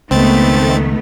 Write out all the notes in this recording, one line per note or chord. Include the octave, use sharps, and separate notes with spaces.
C#2 D#3 A3 B3 C4 A6